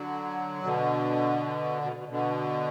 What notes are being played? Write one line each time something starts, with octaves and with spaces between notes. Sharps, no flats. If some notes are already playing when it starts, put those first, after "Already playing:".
Already playing: D3 F#3
B2 D3
B2
B2
B2 D3